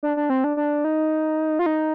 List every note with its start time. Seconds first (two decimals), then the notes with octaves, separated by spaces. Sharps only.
0.03 D4
0.17 D4
0.30 C4
0.44 D4
0.57 D4
0.84 D#4
1.59 F4
1.66 D#4